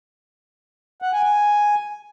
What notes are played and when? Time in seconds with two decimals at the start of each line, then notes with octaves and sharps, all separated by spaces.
1.02 F#5
1.13 G#5
1.24 G#5